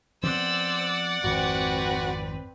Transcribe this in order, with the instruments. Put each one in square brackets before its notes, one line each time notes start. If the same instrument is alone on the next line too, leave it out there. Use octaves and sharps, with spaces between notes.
[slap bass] F3 B3 C4 [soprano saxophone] C5 [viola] D5 F#5 [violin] E6
[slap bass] G#1 F2 [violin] C4 B4 [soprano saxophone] F#4